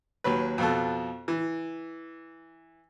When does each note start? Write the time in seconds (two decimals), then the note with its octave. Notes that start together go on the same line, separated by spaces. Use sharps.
0.24 D#2 F#3 B4
0.58 F2 B2 A4
1.28 E3